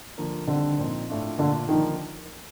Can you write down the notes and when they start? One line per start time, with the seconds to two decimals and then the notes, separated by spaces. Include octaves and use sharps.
0.18 D3 F3 A#3
0.48 D3 D#3 G3 C4
0.78 A#2 F3 C4 D#4
1.09 A2 A3 D4 F4
1.38 A#2 D3 A3 D4 F4
1.69 D3 D#3 F3 A#3 D#4